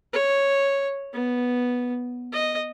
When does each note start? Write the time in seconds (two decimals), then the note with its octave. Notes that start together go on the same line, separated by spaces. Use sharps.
0.13 C#5
1.13 B3
2.32 D#5